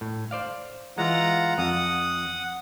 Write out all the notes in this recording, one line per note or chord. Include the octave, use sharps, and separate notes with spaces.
A2
C5 D5 F5
E3 G#3 F4 F#5 A#5
F2 F#5 D#6